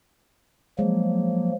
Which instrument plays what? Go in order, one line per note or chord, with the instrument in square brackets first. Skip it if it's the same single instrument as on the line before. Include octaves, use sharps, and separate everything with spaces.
[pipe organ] F3 F#3 A#3 [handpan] G#3